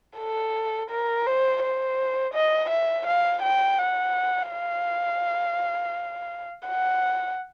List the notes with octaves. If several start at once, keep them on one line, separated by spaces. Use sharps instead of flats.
A4
A#4
C5
C5
D#5
E5
F5
G5
F#5
F5
F#5